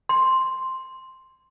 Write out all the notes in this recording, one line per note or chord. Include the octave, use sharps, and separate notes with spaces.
C6